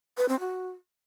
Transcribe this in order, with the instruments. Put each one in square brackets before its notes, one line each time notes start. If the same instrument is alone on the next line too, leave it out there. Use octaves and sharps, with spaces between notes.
[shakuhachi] B4
C4
F#4